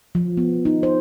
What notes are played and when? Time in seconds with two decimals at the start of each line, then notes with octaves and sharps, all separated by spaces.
0.15 F3
0.37 B3
0.65 D#4
0.83 C5